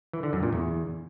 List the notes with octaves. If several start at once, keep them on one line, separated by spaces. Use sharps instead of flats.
E3
D3
F#2
A#2
E2